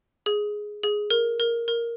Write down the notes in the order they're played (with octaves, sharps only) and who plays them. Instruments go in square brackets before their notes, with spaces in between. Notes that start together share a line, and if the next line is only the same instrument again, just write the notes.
[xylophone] G#4
G#4
A#4
A#4
A#4